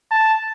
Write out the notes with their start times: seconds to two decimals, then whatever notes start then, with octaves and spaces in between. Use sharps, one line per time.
0.11 A5